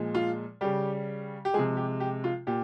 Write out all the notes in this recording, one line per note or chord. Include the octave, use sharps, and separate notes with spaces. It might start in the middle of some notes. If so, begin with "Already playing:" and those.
Already playing: A#2 F3 G#3
F4
C#3 G3 G4
G4
C3 F3 G#3 G#4
G4
G4
F4
A#2 G4